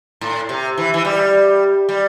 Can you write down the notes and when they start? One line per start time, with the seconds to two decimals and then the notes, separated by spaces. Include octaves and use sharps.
0.21 A2
0.49 C3
0.77 E3
0.94 E3
1.05 G3
1.89 G3